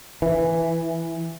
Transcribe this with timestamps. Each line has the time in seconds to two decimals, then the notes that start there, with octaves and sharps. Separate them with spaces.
0.22 E3